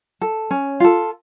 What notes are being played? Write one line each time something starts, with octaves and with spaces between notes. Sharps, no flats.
A4
C#4
F4 A4